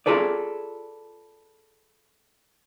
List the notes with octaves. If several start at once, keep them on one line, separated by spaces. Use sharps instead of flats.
F4 G#4 A4 B4 D5